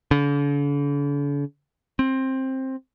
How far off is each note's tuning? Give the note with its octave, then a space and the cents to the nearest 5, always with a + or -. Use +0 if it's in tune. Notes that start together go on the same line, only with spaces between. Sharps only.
D3 -45
C4 +15